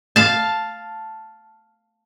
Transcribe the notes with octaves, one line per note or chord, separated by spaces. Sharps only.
F5 A5